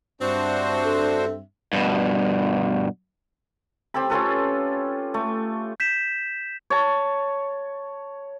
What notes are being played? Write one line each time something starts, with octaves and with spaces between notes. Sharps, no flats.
G2 C4 D4 F#4 C5 E5
A4
G2 B2
C4 G4 A4 B5
C#4 F4 A4 B4
A3
G6 B6 E7
C#5 A5